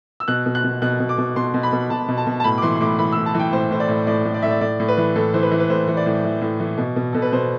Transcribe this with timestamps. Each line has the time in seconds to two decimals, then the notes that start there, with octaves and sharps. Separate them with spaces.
0.20 E6
0.28 B2 F#6
0.46 B2
0.55 F#6
0.64 B2
0.82 B2 F#6
1.00 B2
1.09 D6
1.18 B2
1.36 B2 C6
1.54 B2
1.63 B5
1.73 B2
1.90 B2 A5
2.08 B2
2.17 A5
2.27 B2
2.40 A5
2.44 A2 B5
2.58 D6
2.62 E3 C6
2.76 C6
2.81 A2 D6
2.99 E3 B5
3.12 A2 E6
3.26 A5
3.34 E3
3.40 G5
3.53 A2 C5
3.71 A2 C5
3.80 D5
3.89 A2
4.07 A2 D5
4.25 A2
4.34 D5
4.42 A2 E5
4.50 D5
4.61 A2 D5
4.80 A2
4.88 B4
4.97 E3
5.15 A2 A4
5.34 E3 C5
5.43 B4
5.51 E3
5.60 B4
5.70 A2 C5
5.87 E3
5.97 D5
6.06 A2
6.24 E3
6.41 A2
6.60 E3
6.78 B2
6.96 B2
7.13 B2 A4
7.22 B4
7.32 B2 C5